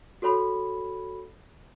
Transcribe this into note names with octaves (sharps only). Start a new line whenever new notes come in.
F#4 A4 C#5 B5